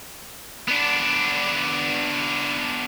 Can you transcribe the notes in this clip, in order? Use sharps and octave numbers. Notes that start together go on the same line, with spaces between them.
B3 D4